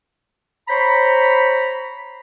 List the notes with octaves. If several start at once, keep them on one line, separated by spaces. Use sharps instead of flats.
C5 C#5 A#5 B5